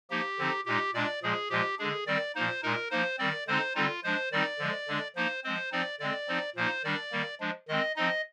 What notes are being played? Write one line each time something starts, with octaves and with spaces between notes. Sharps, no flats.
F3 A#3 D#4 G4
D3 F3 C4 D#4
A#2 G#3 D#4 G4
A#2 G#3 D4 D5
A#2 F3 G#3 G#4
A#2 F3 G#3 G4
D3 G#3 D4 G#4
D#3 G3 C4 D5
A#2 F3 A#3 D#4 C5
A#2 G#3 D#4 A#4
F3 A#3 D#4 C5
D#3 G3 C4 D5
D3 G#3 C4 D#4 C5
D3 G3 C4 D#4 F4
F3 G#3 D4 C5
D#3 G3 C4 D#4 D5
D3 F3 G#3
D3 G#3 D4
F3 A#3 D#4 C5
F3 G#3 C4 C5
F3 C4 D#4 D5
D3 G#3 C4 D5
F3 C4 D#4
A#2 F3 A#3 D#4 C5
D#3 G3 D4 D5
D#3 G3 A#3
F3 G#3 D4
D#3 G#3 C4 D#5
F3 C4 D#4 D#5